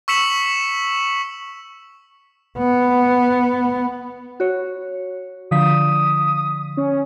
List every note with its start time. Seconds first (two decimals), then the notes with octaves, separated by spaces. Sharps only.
0.08 C#6 E6 B6 C#7 E7 F#7
2.58 B3
4.40 F#4 C#5
5.51 D3 F3 D#6 B6
6.77 C#4